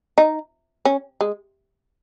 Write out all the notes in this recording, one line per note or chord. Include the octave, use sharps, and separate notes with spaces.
D#4
C#4
G#3